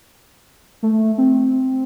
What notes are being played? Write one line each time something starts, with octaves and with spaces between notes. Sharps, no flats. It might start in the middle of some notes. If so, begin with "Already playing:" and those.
A3
C4